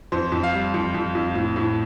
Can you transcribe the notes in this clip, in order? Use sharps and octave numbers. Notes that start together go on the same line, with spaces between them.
F2 C5
F2
F5
G3
F2
F2
F2
A2
A2